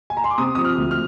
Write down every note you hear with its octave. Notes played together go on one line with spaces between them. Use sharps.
G#5
A#5
C6
D6
C3 D#6
F3 D#6
F6
D2
F6